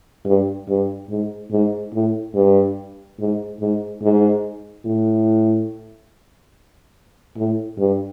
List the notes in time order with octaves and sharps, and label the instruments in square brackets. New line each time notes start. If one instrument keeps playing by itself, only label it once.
[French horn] G2
G2
G#2
G#2
A2
G2
G#2
G#2
G#2
A2
A2
G2